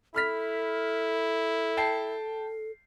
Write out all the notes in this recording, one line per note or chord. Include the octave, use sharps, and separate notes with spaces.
E4 A4 B5 F6 B6
G5 A5 C7